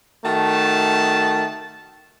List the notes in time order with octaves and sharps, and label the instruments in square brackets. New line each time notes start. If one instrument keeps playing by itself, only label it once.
[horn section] D#3 A3 F#4 A5